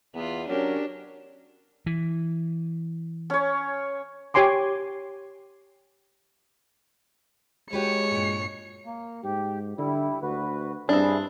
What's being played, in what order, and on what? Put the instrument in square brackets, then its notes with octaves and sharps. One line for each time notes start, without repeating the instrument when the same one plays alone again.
[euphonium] E2 [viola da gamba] B3 F4
[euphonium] F#3 [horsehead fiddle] C#4 A#4 [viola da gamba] D4 G4
[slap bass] E3
[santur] C#4 C#5
[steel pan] G4 C#5 G#5 C6 D6
[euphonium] G#3 [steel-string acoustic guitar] F#4 G4 B4 [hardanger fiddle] C#5 [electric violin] C#7
[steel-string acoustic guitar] G2 A#2
[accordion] A#3
[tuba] G#2 [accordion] G4
[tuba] D3 [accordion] G3 E4
[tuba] D2 [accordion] F#4 B4
[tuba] G2 [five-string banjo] C4 D4 [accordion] E4 G#4